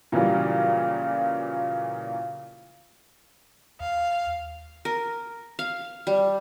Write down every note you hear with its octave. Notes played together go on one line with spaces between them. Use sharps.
A#2 C#3 E3 F#3 G3
D#2 F5
A#4
F5
G3